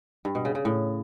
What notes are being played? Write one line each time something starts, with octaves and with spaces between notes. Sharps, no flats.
G2
B2
C#3
C#3
A2